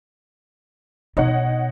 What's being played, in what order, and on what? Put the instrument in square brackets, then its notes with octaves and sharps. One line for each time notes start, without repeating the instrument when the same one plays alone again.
[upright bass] B2 [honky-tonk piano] D#4 C#5 F#5